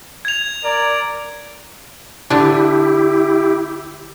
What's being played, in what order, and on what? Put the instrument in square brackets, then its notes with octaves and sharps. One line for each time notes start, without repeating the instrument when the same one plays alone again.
[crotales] G#6 F7
[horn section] A#4 D5
[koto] D3 D4 [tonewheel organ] E4 G4